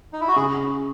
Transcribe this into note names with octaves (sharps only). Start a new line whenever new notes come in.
D#4
E4
F#4
C#3 G#4